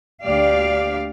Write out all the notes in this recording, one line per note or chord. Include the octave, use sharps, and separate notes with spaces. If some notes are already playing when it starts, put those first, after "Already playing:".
D2 G4 D5 F5